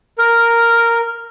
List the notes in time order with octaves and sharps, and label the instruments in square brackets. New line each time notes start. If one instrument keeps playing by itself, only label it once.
[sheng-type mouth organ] A#4 [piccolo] F6